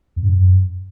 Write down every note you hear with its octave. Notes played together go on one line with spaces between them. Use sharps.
E2
G2
F#2